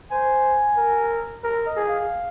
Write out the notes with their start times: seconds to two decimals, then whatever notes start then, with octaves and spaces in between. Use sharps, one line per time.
0.11 C5 G#5
0.77 A#4
1.44 A#4
1.66 D#5
1.77 G#4
1.87 F5